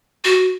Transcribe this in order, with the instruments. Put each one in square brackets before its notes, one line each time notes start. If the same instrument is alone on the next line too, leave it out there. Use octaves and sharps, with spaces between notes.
[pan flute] F#4